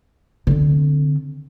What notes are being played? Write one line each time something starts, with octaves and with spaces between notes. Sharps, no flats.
D3 C4